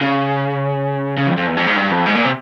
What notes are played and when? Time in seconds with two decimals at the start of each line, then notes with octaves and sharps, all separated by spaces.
0.01 C#3
1.18 C#3
1.27 F2
1.38 F2
1.47 E2
1.57 F2
1.67 G#2
1.77 G2
1.92 F2
2.07 G#2
2.16 A#2
2.25 C3